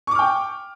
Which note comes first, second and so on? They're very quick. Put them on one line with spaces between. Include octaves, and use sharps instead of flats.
C#6 D6 F6 G5